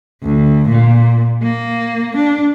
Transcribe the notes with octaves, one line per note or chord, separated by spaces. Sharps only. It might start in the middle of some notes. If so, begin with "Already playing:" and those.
D2
A#2
A#3
D4